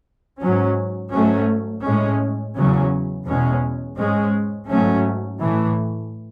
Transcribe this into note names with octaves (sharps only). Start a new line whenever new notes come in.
G#2 F#3 C#4
G#2 F#3 A3 C#4
A2 G#3 C#4
E2 C#3 F#3 C#4
E2 B2 G#3 C#4
G#2 G#3 C#4
G#2 F#3 A3 C#4
A2 E3 A3